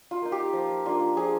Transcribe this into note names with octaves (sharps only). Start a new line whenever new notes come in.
F4
A#3 D#4
G4
F3
A#3 D4 F4
F3 G#4